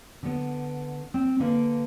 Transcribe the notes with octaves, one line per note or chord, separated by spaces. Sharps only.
D3 B3
C4
D3 A#3 B4 F5